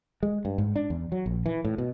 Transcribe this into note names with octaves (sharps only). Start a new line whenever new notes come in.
G#3
G2
G#2
D4
E2
F#3
A#1
E3
A2
B2